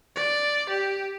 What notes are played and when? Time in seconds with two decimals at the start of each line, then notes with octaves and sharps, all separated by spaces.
0.16 D5
0.69 G4